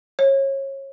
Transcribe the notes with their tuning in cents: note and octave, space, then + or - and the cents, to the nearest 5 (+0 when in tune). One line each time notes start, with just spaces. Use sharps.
C#5 -25